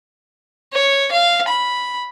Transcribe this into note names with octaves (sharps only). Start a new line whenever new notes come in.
C#5
F5
B5